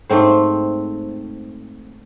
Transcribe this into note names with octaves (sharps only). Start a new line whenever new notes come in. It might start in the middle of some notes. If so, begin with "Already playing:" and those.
G#2 A3 C4 C5